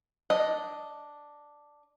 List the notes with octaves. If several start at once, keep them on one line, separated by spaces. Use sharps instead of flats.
D4 D#5